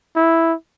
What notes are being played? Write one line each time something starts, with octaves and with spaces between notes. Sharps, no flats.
E4